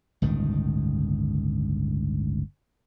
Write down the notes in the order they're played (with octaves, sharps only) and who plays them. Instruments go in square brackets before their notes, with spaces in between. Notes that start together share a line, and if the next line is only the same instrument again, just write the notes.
[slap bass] G1 C#2 A2 D#3